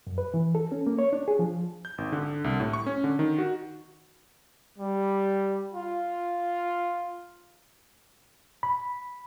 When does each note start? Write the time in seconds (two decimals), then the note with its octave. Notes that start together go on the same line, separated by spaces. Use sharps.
0.07 F#2
0.18 B4
0.34 E3
0.55 A4
0.72 C#4
0.87 A#3
0.99 C#5
1.13 D4
1.28 G#4
1.39 F3
1.85 G6
1.98 G#1
2.12 D3
2.44 C2
2.60 A2
2.73 C#6
2.86 C#4
3.04 D3
3.19 D#3
3.38 F#4
4.79 G3
5.74 F4
8.63 B5